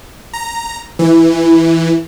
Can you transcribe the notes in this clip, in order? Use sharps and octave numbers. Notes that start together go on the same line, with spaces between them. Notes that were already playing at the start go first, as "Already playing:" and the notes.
A#5
E3